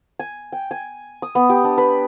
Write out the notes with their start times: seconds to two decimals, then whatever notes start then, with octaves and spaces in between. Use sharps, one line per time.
0.19 G#5
0.53 G5
0.71 G#5
1.22 D#6
1.35 B3
1.50 G4
1.64 D4
1.78 B4